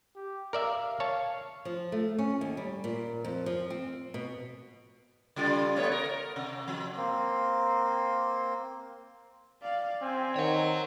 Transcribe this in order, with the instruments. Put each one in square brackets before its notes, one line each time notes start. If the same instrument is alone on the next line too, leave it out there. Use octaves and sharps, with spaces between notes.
[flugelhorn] G4
[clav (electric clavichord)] A#4 D5 E5 [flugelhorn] F5
[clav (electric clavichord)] C#5 A5 [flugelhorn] F5
[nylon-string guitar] F3
A3
C#4
D#2
G3
A#2
F2
F3
C4
B2
[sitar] C#3 G3 F4
A3 B3 C#5
A#4
C3
F3
[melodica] A#3 C4
[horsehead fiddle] D5 F5
[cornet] C4 [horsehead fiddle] G4 G#5
[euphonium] D#3 [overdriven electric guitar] C#5 F#5